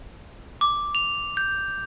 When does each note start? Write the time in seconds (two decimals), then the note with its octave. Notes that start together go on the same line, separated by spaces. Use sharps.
0.61 D6
0.95 F7
1.37 G6